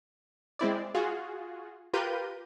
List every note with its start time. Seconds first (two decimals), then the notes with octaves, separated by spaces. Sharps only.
0.59 G#3 C4 E4 D5
0.95 F4 F#4 G#4
1.93 F4 G4 A#4 B4 G6 D#7